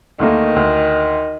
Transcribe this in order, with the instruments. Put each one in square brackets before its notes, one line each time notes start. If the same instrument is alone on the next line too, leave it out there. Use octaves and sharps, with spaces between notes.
[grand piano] D2 A3 A#3 [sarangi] D#3
[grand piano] D2